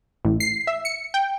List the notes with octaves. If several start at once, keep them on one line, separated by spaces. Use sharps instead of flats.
A1
C7
E5
C#7
G5